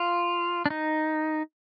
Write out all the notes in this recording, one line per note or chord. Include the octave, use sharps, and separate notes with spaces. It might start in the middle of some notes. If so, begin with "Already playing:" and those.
Already playing: F4
D4
D#4